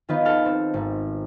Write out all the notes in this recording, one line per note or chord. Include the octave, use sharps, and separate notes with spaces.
D#3 B3 D#4 F4 B4 D#5
A4 A5 F6
C4
G#1